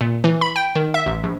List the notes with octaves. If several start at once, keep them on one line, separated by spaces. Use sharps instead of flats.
A#2
E3
B5
G5
D#3
E5
A1
A#1